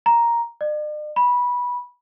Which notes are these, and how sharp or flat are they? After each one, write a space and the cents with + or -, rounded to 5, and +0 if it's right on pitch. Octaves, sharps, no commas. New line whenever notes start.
A#5 +5
D5 +45
B5 -15